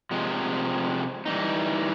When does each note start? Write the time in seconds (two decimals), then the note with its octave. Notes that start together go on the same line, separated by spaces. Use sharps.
0.11 C3 F3 G#3
1.26 E3 G3 C4 D#4